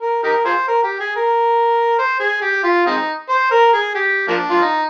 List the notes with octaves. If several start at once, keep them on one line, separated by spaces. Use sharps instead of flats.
A#4
D#4 G4 A#4
F4 G#4 C5
A#4
G4
G#4
A#4
C5
G#4
G4
F4
G#3 C4 D#4
C5
A#4
G#4
G4
F3 A#3 D4
F4
D#4